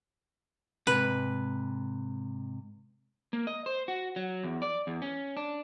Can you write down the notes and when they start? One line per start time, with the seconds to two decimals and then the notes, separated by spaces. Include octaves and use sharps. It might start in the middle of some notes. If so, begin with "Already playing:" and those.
0.87 G#2 C3 B4
3.33 A#3
3.47 D#5
3.66 C5
3.88 F#4
4.16 F#3
4.44 E2
4.62 D5
4.87 E2
5.02 C#4
5.37 D4